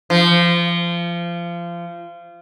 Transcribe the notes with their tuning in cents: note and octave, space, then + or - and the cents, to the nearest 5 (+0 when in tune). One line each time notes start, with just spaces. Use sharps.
F3 -25